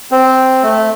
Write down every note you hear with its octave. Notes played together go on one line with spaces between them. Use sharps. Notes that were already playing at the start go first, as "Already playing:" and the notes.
C4
A3